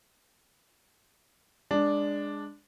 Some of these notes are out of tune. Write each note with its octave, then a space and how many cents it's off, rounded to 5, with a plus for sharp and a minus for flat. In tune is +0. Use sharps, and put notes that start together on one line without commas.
G#3 -15 D4 +0